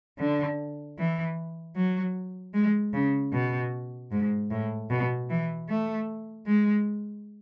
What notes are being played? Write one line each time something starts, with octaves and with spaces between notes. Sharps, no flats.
D3
E3
F#3
G#3
C#3
B2
G#2
A2
B2
E3
A3
G#3